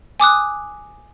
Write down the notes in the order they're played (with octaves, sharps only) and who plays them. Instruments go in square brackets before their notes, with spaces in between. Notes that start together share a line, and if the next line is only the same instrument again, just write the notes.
[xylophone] G#5 D6 D#6 F#6